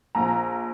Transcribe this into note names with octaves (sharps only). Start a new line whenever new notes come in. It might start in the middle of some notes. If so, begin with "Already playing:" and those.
A#1 A#5